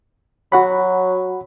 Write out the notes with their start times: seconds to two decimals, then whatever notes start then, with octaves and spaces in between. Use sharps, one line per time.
0.52 F#3 F#4 F#5 B5